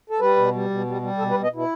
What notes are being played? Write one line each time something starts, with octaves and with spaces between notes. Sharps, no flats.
A4
G3 B4
B2
G3
B2
G3
G3
B2 A4
B4
B2
D#5
B2 E4